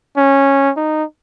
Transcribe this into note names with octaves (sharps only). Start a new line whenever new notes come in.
C#4
D#4